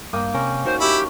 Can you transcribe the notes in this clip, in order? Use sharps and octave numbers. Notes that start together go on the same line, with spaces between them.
G2 A#3 G5 D#6
C3 C#4 A#4
D#4 F#4 A#4 C5
E4 G4